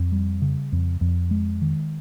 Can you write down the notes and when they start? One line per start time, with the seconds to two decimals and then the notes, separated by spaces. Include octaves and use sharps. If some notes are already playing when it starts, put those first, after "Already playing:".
Already playing: F2
0.12 G3
0.42 C#3
0.72 F2
1.01 F2
1.31 G#3
1.62 D#3